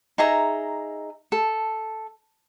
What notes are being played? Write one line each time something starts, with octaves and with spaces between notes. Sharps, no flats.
D#4 G#4 E5 A#5
A4